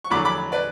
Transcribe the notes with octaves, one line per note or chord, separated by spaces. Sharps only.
C#6
E2 D3 F#3 B5 D6
B5 D6
B4 D5